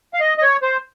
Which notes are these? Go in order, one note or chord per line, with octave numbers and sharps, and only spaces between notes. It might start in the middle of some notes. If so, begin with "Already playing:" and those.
F5
D#5
D#5
C#5
C5